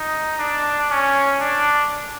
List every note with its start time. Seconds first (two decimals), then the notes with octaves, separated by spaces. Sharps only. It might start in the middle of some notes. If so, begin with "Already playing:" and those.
Already playing: D#4
0.39 D4
0.90 C#4
1.41 D4